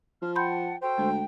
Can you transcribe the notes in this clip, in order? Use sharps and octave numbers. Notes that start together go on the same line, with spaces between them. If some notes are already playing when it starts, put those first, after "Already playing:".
F3 F6
F#5 G5 A5 B5 C6 G6
F#4 A4 C5 G5
D2 G#3